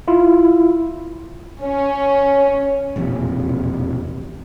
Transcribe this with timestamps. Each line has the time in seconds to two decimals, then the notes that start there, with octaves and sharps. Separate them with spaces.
0.08 E4 F4
1.63 C#4
2.96 E1 A#1 F2 C3